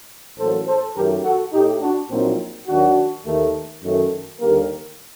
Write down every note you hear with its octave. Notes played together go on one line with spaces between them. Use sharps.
A1 A2 F#3 A#3 A4 C5
A4 C5
F#2 D#3 F#3 A3 G4 A#4
F#4 A4
A2 A3 D#4 G4
D4 F#4
A#1 A#2 F#3 A#3 C4 D#4
D#2 D#3 F#3 D4 F#4
D#2 D#3 A3
F#2 D#3 A3
D#2 D3 G3 A#3 G4 A#4